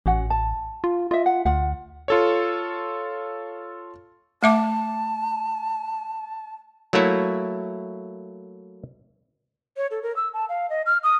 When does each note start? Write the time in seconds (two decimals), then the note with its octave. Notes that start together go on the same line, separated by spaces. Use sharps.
0.06 A1 C#4 F#4 F#5
0.30 A5
0.84 F4
1.11 F4 D#5 E5
1.26 F#5
1.46 D2 F4 F#5
2.08 F4 A4 C#5
4.43 A3 E5 A5 D6
6.93 F#3 A3 A#3 E4 C#5
9.77 C#5
9.91 A4
10.03 A#4
10.16 E6
10.34 A5
10.49 F5
10.70 D#5
10.86 F6
11.03 D#6